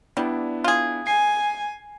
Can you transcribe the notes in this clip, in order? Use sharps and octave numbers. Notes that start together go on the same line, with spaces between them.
G3 B3 D4 E4
F4 G#4
G#5 C7